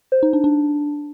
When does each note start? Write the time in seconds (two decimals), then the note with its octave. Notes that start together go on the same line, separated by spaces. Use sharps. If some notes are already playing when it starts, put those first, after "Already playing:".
0.12 C5
0.23 D#4
0.33 D4
0.44 D4